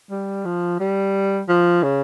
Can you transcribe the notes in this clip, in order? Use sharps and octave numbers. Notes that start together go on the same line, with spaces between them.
G3
F3
G3
F3
C#3